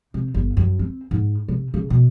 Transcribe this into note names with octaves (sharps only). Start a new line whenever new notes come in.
C3
G1
F#2
C4
G#2
C3
C#3
B2